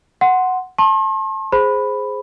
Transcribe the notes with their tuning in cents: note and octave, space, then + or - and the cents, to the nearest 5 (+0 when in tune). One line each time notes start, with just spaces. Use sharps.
F#5 +0 C6 +0
A5 +0 C6 +45
G#4 +0 C5 +0 B5 +5